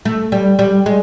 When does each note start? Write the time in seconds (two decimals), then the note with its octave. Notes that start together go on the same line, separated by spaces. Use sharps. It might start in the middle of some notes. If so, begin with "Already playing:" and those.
0.05 A3
0.32 G3
0.59 G3
0.86 G#3